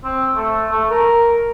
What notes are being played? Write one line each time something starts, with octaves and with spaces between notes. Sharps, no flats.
C4
A3
A3
A#4